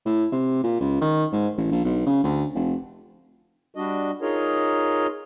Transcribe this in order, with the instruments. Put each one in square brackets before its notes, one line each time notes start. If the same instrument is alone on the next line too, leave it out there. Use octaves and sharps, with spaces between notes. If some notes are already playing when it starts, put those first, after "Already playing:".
[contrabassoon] A2
C3
A#2
C#2
D#3
G#2
A1
A#1
B1
C#3
D2
F1
[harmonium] G3 D4 F#4 D#5
D#4 F4 G#4 A#4 C#5 D#5